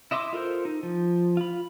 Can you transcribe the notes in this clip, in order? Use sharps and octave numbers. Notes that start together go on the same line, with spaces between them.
E4 D#5 E5 C6 D6
F4 A4 A#4 C5
D#4
F3
F4 B5